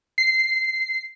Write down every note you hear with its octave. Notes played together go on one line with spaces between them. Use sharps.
C7